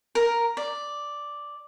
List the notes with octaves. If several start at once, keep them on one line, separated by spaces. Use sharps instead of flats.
A#4
D5